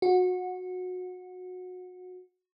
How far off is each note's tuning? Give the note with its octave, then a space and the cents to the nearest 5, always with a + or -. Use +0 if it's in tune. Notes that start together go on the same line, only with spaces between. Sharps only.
F#4 -20